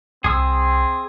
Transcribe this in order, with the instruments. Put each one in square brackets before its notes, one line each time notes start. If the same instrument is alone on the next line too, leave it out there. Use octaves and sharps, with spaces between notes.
[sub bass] C2 [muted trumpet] C4 [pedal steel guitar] G#4 D#6 E6